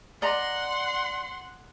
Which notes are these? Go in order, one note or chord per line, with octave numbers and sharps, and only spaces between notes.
D5 D#5 F#5 A#5 C6